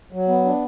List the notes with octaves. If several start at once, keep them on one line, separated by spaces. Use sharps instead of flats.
F#3
B3
D4